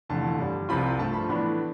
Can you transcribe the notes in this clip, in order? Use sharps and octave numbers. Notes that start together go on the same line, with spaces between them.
F1 E2 D3 A3 A5
G2 D3 G3
C2 C3 F3 C4 F4 B5
G2 F3 A3 A5
B5
A2 E3 B3 D4 B5